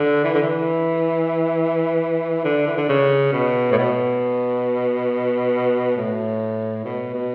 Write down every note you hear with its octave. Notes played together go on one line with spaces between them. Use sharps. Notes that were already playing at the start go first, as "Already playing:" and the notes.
Already playing: D3
E3
D3
E3
D3
E3
D3
C#3
B2
A2
B2
A2
B2
B2